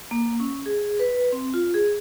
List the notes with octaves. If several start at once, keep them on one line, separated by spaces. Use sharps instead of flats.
A#3
C#4
G#4
B4
C4
F4
G#4